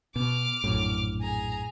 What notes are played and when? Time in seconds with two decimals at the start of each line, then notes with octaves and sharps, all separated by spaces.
0.16 B2 D6 F6
0.64 A#1 F#2 A2
1.21 G#4 A#5